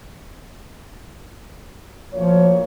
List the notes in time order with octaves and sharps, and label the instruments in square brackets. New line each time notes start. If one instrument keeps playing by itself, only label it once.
[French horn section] D2 A#2 C#5 [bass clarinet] F3